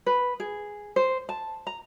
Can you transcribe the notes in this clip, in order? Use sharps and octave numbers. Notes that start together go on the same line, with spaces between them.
B4
G#4
C5
A5
A#5